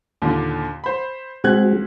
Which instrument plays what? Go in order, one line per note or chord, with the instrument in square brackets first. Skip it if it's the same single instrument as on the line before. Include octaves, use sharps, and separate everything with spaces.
[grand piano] D#2 A#2 D3
C5 B5
[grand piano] C#2 F#6 G#6 [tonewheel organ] G#3 C4 F#4